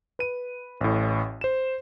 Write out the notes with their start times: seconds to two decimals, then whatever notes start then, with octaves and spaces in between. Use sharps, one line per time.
0.19 B4 D#7
0.81 A1 A2
1.41 C5 E7